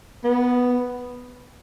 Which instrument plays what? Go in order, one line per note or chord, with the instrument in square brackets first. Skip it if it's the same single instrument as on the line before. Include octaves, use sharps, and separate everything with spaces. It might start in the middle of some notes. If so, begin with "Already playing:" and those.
[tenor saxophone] B3